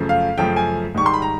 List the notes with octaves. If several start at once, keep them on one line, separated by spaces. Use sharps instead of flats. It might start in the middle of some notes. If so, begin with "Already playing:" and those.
Already playing: F#2 C#3 F3 A3
F5
F#2 C#3 F3 A3 G5
G#5
G#2 D#3 G3 C#6
C6
B5
A#5